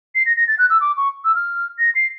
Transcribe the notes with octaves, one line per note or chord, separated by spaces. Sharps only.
C7
A#6
A#6
A6
F#6
E6
D6
C#6
E6
F6
A#6
C7